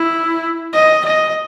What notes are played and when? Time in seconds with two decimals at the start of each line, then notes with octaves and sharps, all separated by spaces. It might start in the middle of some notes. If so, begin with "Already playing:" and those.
Already playing: E4
0.73 D#5
1.05 D#5